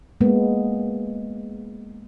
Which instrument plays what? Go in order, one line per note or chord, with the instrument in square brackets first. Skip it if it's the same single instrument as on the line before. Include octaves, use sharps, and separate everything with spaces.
[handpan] G#3 A#3 B3